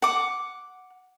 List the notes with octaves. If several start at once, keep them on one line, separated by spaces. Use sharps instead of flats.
F#5 D6